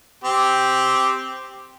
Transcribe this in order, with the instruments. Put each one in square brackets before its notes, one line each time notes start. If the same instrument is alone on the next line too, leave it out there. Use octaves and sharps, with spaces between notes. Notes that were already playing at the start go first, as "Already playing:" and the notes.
[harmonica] C4 G4